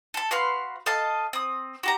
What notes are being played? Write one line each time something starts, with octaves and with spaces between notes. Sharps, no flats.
A4 A5
F#4 B4 F5 C6
A4 D#5 F5 A5
C4 D#6
F#4 G4 A#5